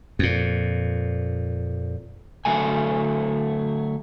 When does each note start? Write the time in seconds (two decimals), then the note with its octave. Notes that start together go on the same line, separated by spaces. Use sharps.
0.19 F2 A#2
2.45 D3 F#3 A3 G#5